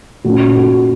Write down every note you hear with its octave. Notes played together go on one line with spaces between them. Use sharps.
A#2 A#3 C#4 F#4
F#4